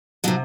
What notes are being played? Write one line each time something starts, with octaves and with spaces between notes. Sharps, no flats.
C3 F3 F#3